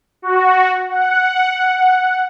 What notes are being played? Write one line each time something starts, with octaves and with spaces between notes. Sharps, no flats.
F#4
F#5